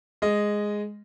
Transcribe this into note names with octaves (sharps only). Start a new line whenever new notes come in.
G#3 D#5